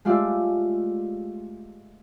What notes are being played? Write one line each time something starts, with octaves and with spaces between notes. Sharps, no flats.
G#3 A3 F4 G4 D5 E5